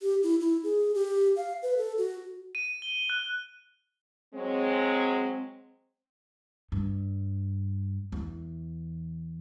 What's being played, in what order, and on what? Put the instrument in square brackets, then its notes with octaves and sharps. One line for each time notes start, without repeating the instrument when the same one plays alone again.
[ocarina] G4
E4
E4
G#4
G4
F5
B4
A4
F#4
[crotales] D#7
G7
F#6
[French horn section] F#3 G#3 [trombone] C4
[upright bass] G2
E2